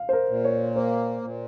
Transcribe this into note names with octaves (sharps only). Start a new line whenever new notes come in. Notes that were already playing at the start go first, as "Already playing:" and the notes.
Already playing: F5
C5
A#4
A#2
C#5
A#3 C5
A#2